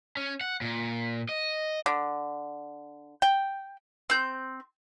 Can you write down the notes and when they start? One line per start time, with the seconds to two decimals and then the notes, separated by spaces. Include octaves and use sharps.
0.17 C#4
0.41 F#5
0.61 A#2
1.29 D#5
1.86 D3
3.22 G5
4.10 C4 G6